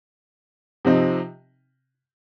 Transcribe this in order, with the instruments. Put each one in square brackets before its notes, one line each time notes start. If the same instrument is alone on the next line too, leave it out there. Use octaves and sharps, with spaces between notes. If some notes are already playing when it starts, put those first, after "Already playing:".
[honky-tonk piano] C3 F3 C4 D#4